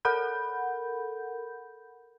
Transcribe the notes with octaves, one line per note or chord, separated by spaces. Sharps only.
A4 A#4 F#5 B5 G6